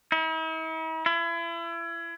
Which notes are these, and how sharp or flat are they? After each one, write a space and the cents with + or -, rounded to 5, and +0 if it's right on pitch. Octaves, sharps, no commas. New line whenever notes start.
E4 -45
E4 +35